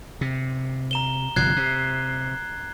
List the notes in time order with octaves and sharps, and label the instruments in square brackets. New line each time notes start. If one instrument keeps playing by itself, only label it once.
[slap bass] C3
[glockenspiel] A#5 E7 G7
[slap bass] G1 C3 F3 [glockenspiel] F#6 G#6 C7
[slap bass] C3